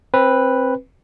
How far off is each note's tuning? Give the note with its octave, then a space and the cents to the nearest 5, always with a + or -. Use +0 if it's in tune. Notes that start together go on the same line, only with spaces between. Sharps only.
C4 +20 B4 +0